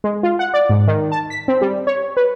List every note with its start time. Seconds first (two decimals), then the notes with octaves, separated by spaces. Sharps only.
0.04 G#3
0.23 F4
0.39 F#5
0.54 D5
0.69 G#2
0.88 D#3
1.12 A5
1.30 B6
1.48 C4
1.61 G3
1.87 C#5
2.17 B4